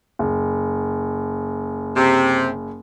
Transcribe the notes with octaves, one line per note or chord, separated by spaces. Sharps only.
F#1
C3